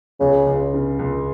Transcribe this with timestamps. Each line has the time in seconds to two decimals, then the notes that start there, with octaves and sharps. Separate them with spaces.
0.20 C#2 C#3
0.47 C#2
0.74 C#3
0.99 C#2